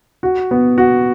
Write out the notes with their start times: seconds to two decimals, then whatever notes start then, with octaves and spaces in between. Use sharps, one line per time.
0.23 F#4
0.51 B3
0.78 F#4